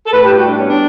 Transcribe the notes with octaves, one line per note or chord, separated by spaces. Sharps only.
A4
A2 B4
G4
G3 F#4
D4
B3 C#4
D4